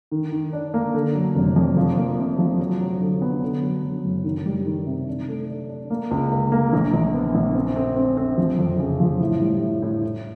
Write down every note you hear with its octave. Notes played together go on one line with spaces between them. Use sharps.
D#3
D#3
D4
A#3
D3
F#3
F1
F2
F3
A#3
C3
F3
F#3
F#3
D3
B3
D3
F#3
F#3
F#1
D#3
G3
D#3
C3
D4
A3
D4
D4
A#3
C#2
A#3
A#3
A#1
A#1
B3
A#1
C4
C4
C4
C4
F3
F2
C#3
F3
A2
G3
A2
A2
A2